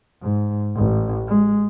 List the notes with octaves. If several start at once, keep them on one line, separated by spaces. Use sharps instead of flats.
G#2
A1
G#3